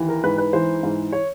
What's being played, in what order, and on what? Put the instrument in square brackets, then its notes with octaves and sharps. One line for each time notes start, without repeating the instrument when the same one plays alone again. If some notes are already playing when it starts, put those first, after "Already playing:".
Already playing: [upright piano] D#2 E3
A#4
G#2 B4
B4
E3 C5
G#2
C#5